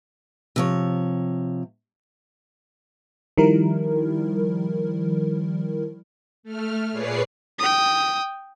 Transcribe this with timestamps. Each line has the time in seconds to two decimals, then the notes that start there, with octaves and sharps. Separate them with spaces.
0.56 C3 F3 C#5
3.38 D#3 F3 G3 E4 A#4
6.43 A3 F6
6.92 A#2 G#4 B4 C#5 D5 C7
7.59 G5 D#6